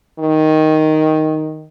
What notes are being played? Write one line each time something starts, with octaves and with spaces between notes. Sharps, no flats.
D#3